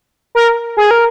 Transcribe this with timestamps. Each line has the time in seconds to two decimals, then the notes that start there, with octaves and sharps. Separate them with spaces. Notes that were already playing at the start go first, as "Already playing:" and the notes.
0.35 A#4
0.77 G#4
0.91 A#4